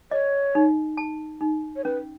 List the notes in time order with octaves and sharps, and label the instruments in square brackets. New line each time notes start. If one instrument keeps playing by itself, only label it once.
[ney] C#5 [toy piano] D#5
[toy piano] D#4
A5
D#4
[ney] C#5
[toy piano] C#4 [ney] B4